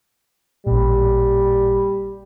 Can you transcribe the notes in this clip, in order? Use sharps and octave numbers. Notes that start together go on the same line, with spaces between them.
A1 A#2 G3